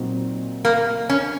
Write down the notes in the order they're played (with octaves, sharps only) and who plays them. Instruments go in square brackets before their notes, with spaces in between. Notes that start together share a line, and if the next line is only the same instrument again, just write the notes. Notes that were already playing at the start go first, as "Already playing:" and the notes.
Already playing: [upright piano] A#2 F#3 C4 D#4
[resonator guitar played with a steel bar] A#3
C#4